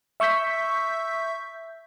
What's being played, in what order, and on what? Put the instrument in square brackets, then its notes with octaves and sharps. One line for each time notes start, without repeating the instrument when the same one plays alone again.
[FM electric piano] E5 C#6 E6 G6 B6